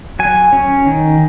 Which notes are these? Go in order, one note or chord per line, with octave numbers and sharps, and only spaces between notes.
F#3 G#5
C#4
D#3